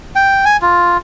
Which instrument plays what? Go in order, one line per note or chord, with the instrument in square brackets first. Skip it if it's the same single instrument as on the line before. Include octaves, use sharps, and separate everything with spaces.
[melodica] G5
G#5
F4